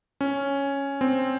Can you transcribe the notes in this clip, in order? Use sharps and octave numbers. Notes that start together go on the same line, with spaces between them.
C#4
C4